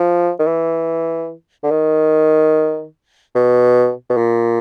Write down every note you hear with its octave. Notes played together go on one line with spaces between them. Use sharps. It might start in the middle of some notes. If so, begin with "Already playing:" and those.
Already playing: F3
D#3
E3
D3
D#3
B2
B2
A#2